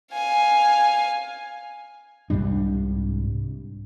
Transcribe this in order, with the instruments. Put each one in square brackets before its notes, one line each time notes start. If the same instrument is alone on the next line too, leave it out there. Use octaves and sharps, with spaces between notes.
[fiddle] F5 G#5
[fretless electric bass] C2 G#2 G3 D4